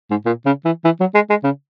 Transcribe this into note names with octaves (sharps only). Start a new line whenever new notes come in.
G#2
A#2
C#3
E3
E3
F#3
G#3
G#3
C#3